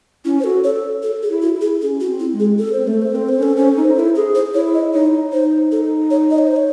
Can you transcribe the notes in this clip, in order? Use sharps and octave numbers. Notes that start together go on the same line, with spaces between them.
C#4 E4
C5
F#4 A4
A4 C#5
A4
G#4
E4
F#4
E4
G#4
C#4 G#4
F#4
C4
E4
G#3
G#4
A4
C4 C5
A3 A4
C5
C4 A4
C5
C#4 A4
C#4 C5
A4
D#4
C5
E4 A4
G#4 A4
C5
E4 C#5
D#5
D#4 C#5
D#4 C5
A4
C#5
D#5
C#5
C5
C#5